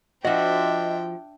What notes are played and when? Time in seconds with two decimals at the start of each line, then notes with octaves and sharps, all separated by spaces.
0.25 F3 D4 F#4 D#5 E5 G5